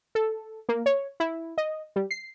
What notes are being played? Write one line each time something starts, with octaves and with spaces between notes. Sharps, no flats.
A4
A#3
C#5
E4
D#5
G3
C7